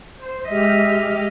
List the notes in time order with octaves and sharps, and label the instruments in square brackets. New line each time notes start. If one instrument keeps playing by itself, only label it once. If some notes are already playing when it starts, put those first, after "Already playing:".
[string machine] C5
[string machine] G#3 G4 F6 [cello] D#5 E5